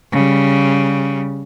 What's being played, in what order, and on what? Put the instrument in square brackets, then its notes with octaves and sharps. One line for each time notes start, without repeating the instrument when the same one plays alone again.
[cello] C#3 G3